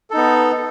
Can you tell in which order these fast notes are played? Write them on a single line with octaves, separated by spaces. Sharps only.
A4 D#4 B3